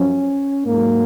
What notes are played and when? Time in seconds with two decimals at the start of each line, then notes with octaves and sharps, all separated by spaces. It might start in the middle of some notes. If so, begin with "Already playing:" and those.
Already playing: F#2 F3 C#4
0.66 G#2 F#3 A#3